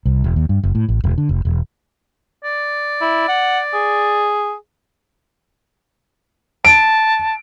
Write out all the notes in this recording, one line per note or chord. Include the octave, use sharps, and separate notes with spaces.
C2
E1
D#2
G2
F#1
A2
A1
E1
D3
F1
E1
D5
E4
F#5
G#4
A5 D7